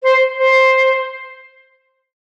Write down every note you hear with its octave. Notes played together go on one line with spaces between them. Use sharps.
C5
C5